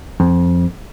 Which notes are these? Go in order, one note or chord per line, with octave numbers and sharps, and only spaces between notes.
F2